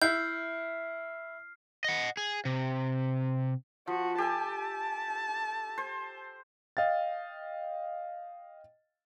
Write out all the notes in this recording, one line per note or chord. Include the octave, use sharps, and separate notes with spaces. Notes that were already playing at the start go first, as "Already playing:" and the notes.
E4 F6 G6 C7
D#5 F#5
G#4
C3
F3 F#4
G4 A4 G#5 A5
C5
D#5 F5 G5 A6